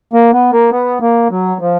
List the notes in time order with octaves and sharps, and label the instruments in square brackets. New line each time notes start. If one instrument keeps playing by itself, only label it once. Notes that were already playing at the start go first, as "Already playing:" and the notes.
[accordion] A#3
B3
A#3
B3
A#3
F#3
F3